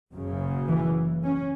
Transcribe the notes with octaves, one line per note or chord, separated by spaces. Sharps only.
F#1 F#2 C#3
E3
C#4